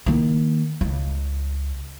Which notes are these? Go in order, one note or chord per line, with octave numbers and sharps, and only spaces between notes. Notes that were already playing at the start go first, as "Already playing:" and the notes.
D#3 A#3
C#2